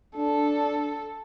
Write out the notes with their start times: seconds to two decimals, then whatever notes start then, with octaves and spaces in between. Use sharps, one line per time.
0.17 D4 A4